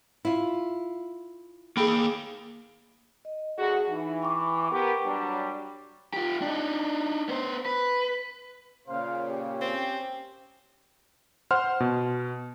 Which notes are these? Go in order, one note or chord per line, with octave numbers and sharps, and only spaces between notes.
E4 F4
A#3 G#4 G5 B5
D#5
D2 F#4 G#4
E3 D#4
G5 C#6 D6
B3 G4 A#4
F#3 G3 D4
F4 G4
D4 D#4
B3 C5
B4
A#2 C#3 C5 F5
C#4 G4
C4
C5 F#5 C6 F6
B2